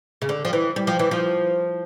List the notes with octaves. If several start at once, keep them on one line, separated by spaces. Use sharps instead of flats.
C#3
D3
F3
E3
G3
F3
E3
F3